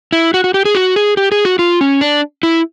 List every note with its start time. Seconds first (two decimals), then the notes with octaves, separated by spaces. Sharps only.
0.13 E4
0.34 F#4
0.44 F#4
0.54 G4
0.65 G#4
0.75 F#4
0.96 G#4
1.17 G4
1.32 G#4
1.45 F#4
1.59 F4
1.81 C#4
2.01 D4
2.43 E4